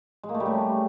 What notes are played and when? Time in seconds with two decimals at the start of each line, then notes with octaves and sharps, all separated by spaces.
0.23 G#3
0.29 A#3
0.35 A3
0.40 G3
0.46 C#3